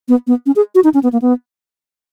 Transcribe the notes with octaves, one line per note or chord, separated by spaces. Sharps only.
B3
B3
C#4
G#4
F#4
D#4
C#4
B3
A#3
B3